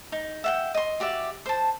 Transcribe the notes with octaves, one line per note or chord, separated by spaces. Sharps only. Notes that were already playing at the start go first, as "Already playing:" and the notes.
D#4
E5 F#5 G5
D#5 C6
F#4 G4 D5 E5
C5 A5